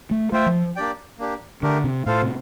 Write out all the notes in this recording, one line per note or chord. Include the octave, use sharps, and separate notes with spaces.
A3
A3 F4 C5 E5 G5
F3
A#3 D4 G4 D5 G5
A#3 D4 G4
D3 A3 D4 G4 A#4
C3
A2 F4 A4 C5 F5
C3